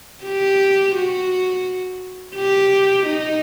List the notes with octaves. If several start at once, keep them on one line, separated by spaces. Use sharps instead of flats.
G4
F#4
G4
D#4